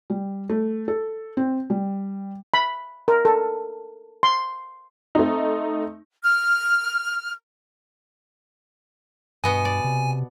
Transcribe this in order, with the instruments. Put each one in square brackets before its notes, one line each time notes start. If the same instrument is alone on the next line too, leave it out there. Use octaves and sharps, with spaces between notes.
[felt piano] G3
A3
A4
C4
G3
[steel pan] B5
A#4
A4
C6
[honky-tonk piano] A3 C4 D#4
[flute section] F6
[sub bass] G2 [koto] B2 B3 D#5 [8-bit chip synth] G#5
[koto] D5
[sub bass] C3